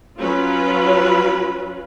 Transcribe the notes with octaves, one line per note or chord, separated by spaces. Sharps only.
F#3 C#4 F4 B4